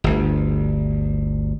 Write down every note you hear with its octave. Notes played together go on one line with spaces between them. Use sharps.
G1 D2